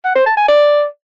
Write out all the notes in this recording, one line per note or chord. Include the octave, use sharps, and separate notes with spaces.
F#5
C5
A5
G#5
D5